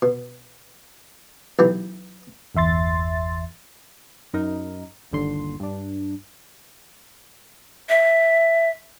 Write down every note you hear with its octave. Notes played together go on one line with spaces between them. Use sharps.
B2
B1 E3 G4
G1 E2 E5 C6 A6
F#2 D#4 A#4
G1 D#2 D3 C6
G2 D4
E5